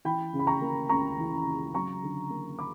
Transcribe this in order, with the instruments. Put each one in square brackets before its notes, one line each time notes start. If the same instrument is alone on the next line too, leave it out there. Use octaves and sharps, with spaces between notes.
[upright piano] E3 G5 B5
C#3
B5
A#5 C#6
A#3
C#2 A#5 C#6
E3
C#3
F#3 A#5 C#6
D3
A#3
B5 D6